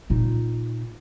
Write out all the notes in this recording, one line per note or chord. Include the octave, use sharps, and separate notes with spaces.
A#2 D#4